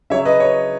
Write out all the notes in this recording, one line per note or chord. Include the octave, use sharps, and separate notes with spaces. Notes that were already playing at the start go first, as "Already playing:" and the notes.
C#3 F#3 C#5 E5
B4 D#5
C#5